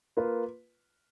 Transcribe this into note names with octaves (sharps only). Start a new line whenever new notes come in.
A#3 F4 B4